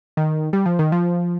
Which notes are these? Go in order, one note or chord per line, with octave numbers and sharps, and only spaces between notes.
D#3
G3
F3
D#3
F3